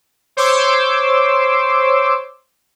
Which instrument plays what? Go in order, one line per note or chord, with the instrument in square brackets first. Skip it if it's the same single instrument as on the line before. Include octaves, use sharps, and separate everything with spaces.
[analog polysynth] C5 C#5 C6 D6 E6